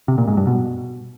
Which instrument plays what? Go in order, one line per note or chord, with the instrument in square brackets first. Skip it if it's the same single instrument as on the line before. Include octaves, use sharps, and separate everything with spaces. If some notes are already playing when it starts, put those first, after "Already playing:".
[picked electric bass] C3
A#2
G#2
G2
B2